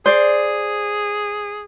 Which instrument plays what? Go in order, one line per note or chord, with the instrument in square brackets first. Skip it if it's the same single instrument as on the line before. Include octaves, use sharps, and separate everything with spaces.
[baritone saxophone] G#4 [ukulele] C5 D5